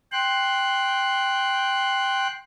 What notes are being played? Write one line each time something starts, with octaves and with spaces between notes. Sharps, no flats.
G5 C6 F#6